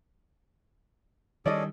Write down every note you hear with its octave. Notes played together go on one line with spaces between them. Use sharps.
D#3 G3 C#4 G#4 A4 D5 D#5